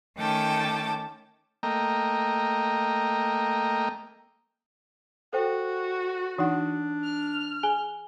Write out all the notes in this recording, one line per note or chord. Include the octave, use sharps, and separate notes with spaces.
D#3 A3 C#4 G5 A5 D6
A3 A#3 D#5 G5 A#5
F#4 A4 C5 G5
E3 D4 D#4 F#5 D#6
F6
G#4 G#5 G7